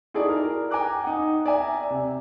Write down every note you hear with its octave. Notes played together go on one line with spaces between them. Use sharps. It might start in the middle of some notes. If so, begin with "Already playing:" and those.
D#4 E4 F#4 G#4 A4 D5
A#4
G5 G#5 A#5 D6 F#6
D#4 F#5
D5 E5 G#5 A#5
C3